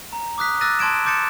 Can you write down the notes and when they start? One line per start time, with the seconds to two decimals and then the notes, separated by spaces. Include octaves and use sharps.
0.13 A#5
0.38 D6 D#6 F#6 B6
0.61 D6 E6 F#6 A6 A#6 D#7
0.79 A5 C6 G#6 D7 E7
1.05 C6 D6 G6 A6 C#7 E7